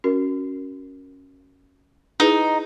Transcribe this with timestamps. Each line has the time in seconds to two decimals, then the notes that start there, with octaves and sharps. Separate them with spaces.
0.04 C#4 F#4 A#4
2.20 D#4 E4 G#4 B4